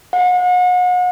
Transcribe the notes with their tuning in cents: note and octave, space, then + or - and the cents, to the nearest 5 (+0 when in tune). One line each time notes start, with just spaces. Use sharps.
F#5 -35